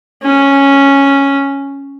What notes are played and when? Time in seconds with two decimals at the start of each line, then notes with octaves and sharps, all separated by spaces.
0.23 C#4